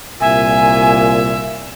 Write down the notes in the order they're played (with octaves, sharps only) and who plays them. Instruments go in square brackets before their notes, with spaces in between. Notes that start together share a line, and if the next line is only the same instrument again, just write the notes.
[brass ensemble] C2 A#2 [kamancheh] E5 [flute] G#5